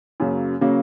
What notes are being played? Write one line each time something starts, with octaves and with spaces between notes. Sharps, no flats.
F#2 C#3 F#3 A#3
C#3 F#3 A#3